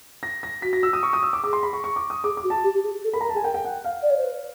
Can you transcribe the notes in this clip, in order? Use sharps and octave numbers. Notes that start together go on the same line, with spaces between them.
A#6
A#6
F#4 B6
A#6
E6
D#6
C#6
D#6
E6
D6
G#4 D6
C6
B5
C#6
C#6
D6
D#6
G#4 D6
D6
F#4
A5
G4
G4
G#4
A4
A#4 B5
A#5
A#4
A5
G#4 G#5
A#4 G5
G5
F#5
F5
D5
C#5
C5
B4